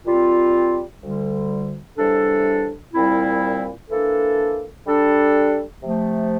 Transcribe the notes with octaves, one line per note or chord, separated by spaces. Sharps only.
A#2 G3 C4 F4
D2 D3 G3
E2 C3 G3 D4 A4
C2 A#2 G3 C4 E4
E3 A#3 D4 A4
G3 D4 A4
C3 F3 A3